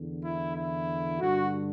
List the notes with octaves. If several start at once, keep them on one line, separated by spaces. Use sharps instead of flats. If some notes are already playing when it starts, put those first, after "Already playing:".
Already playing: E2 D3
E4
E4
G2 D3 F#4